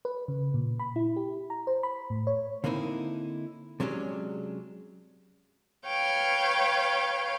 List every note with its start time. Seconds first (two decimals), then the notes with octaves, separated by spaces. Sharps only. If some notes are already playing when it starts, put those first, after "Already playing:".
0.05 B4
0.28 C#3
0.54 A#2
0.80 B5
0.96 E4
1.16 G4
1.50 A#5
1.67 C5
1.83 B5
2.10 A2
2.27 C#5
2.64 D3 A#3 C4 D#4 E4
3.80 C3 F#3 G#3 C#4 D4
5.86 B4 C#5 F5 G5